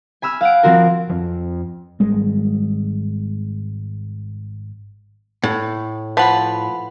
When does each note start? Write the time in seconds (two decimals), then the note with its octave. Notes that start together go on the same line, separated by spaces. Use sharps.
0.22 G#5 B5 E6 F6
0.41 F5 F#5 D7
0.63 F3 C4 F#4 A#4
1.09 F2 F3
2.00 G#1 G3 G#3
5.43 A2
6.17 F3 B4 F#5 B5